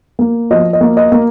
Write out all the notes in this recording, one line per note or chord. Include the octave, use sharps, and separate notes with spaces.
A#3
F3 D#5
D#5
A#3
D#5
A#3